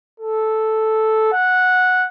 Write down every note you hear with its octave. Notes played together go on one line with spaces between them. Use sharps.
A4
F#5